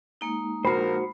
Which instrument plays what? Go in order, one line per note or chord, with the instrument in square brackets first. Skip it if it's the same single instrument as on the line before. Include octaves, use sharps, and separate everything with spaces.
[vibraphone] G#3 A#3 D#4
[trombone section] A#1 A#4 [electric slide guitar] F#4 C5 [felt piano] B5 C7